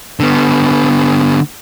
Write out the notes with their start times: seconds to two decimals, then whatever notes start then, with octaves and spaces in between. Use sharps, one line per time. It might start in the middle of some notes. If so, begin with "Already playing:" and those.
0.20 D3 B3